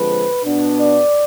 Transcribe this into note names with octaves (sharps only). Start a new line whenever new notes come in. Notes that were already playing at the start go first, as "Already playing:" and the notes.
Already playing: D3 F3 G#3 C4 B4
B2 B3 D4
D5